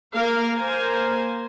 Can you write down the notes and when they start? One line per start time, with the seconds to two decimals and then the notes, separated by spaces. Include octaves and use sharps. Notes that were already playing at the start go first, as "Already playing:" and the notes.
0.14 A#3 A#4 F5
0.55 A#3 A#4 C5 G#5